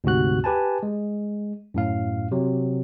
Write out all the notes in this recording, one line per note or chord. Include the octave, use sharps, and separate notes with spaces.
D2 G#2 C3 F#4 F#6
G4 B4 G#5 A5
G#3
F#2 A2 F5
C3 F#3